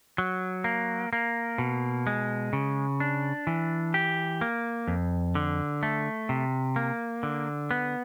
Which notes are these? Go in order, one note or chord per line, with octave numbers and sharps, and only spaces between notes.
F#3
A#3
A#3
B2
G#3
C#3
D4
E3
G4
A#3
F2
D3
A3
C3
A#3
D3
B3